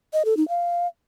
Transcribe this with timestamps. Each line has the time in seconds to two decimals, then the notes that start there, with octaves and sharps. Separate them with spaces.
0.13 D#5
0.25 A4
0.37 D#4
0.49 F5